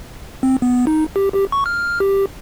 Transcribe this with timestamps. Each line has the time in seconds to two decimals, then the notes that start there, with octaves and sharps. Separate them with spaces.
0.43 C4
0.62 B3
0.87 D#4
1.16 G4
1.34 G4
1.52 C#6
1.66 F6
2.00 G4